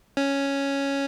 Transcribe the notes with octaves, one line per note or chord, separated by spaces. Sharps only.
C#4